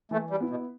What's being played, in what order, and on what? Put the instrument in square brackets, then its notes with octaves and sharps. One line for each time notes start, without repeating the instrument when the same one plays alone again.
[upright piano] E3 [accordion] A3
[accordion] G3
[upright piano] B3 E4
[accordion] B2